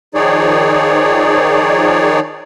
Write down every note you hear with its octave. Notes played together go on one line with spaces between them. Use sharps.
D#3 F3 D#4 G#4 C#5 D5